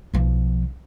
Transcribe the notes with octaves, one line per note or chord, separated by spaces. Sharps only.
B1 F3